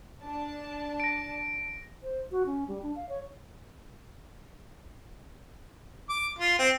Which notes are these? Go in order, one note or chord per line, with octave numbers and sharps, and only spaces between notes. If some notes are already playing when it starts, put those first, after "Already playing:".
D4 A5
A#6 D7
C5
F#4
C#4
G3
D4
F5
C#5
D6
F4
C4